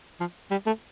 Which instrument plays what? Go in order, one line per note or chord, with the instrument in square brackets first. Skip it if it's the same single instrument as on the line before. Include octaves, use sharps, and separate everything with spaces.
[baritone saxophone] F3
G3
A3